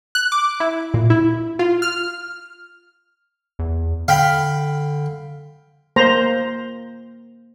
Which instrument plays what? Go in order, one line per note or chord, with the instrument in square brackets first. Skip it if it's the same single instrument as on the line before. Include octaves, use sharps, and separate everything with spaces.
[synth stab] F#6
D6
E4
A#2
E4
F4
F6
[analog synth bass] E2
[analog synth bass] D3 [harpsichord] F5 G5 B5
[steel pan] A#3 C5 A#5